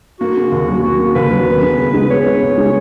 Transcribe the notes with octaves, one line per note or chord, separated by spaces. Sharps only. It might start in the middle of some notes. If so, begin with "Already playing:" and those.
A#3 F#4
C#3
D#2
F#3
A#3 F#4
C#3
D#2 B4
F#3
B3
C#3
C#2
G#3
B3 C#5
C#3
C#2
G#3